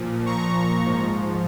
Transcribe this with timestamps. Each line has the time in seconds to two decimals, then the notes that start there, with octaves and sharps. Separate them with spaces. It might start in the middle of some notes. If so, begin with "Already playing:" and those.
Already playing: A#2 F3
0.26 A#5 C#6
0.85 G#2 F3